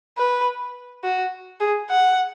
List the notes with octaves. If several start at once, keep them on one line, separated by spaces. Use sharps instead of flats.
B4
F#4
G#4
F#5